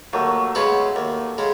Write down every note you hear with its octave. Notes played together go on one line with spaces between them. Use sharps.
D#2 F#3 A3
C#3 G#3 B3 F#4
D#2
C#3 G#3